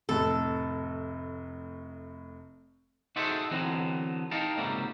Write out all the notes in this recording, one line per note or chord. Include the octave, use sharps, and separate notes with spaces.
F1 A2 A4
D#4 F#4 G#4 A4 C5 E5
D3 E3 F#3 B3 C4
D#4 G4 A#4 F5 A5
C#2 G#2 C3 F#3 G3 A#3